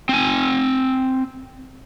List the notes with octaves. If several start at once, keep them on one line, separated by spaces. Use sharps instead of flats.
C4 G#5